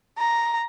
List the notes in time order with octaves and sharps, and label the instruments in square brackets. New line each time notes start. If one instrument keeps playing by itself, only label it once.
[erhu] A#5